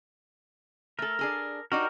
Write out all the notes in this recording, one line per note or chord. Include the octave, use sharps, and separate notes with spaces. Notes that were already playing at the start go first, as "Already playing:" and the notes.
A3 A4 A#4
D4 G#4 A4
D4 D#4 F#4 G4 A#4